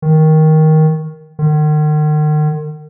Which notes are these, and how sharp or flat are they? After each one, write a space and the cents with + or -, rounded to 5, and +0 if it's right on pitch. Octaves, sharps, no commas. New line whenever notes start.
D#3 +10
D#3 -40